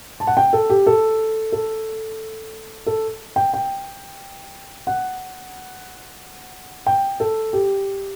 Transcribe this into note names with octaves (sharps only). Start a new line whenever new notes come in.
A5
F#5
G5
A4
G4
A4
A4
A4
G5
G5
F#5
G5
A4
G4